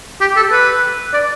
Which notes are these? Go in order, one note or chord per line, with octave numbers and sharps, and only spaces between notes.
G4
A4
B4
D5